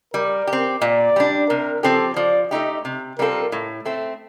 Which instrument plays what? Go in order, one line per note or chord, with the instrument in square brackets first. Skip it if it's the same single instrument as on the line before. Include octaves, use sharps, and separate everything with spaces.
[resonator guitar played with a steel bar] G3 [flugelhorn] A#4
[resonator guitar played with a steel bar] G4
C4
[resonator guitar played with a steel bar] A#2 [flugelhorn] D5
[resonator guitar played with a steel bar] G3 D4
[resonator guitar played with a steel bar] C3 [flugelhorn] A#4
[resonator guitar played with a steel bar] F3 C4 G4 [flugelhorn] A4
[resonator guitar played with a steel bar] F3 [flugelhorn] D5
[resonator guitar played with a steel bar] A3 D#4 G4 [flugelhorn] D#5
[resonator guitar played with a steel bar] C3
[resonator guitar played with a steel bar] G3 C4 F4 A4 [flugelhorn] A#4
[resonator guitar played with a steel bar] A2
A3 C4